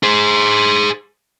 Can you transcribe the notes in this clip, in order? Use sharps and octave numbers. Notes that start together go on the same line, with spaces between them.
G#4 C5